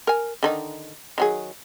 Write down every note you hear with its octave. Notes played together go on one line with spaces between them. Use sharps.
A#4 G#5
D3 D#3 D#4
D#3 F#3 G#4